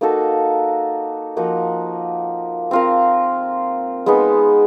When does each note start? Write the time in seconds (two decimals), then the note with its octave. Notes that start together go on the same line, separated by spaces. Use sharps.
0.01 A#3 D#4 F#4 A4
1.36 F3 A#3 D#4 F#4
2.71 C4 F4 A#4
4.06 G#3 B3 D#4